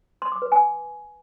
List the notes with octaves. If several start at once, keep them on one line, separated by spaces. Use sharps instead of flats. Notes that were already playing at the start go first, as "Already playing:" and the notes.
C6
D6
B4
G#5